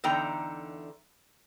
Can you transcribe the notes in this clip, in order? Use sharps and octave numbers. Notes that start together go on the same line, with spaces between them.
E2 D3 D#4 G5 A#5